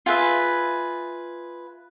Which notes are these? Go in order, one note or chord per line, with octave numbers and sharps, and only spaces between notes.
F4 G#4 B4 E5